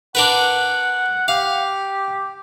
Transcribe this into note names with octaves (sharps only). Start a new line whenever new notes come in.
D4 A#4 B4 F#5
G4 F5